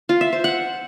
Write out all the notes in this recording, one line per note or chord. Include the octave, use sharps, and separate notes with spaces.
F4
E5
C5
F#5